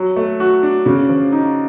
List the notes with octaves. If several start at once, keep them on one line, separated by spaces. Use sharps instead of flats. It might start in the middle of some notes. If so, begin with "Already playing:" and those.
Already playing: F#3
A3
F#4
D4
C#3
F3
D#4